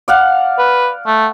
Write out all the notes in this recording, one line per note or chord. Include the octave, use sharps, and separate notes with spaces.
D5 F5 F#5
B4
A3